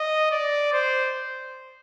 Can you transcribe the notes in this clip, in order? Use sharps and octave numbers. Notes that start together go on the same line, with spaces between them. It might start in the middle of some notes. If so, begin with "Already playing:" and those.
Already playing: D#5
D5
C5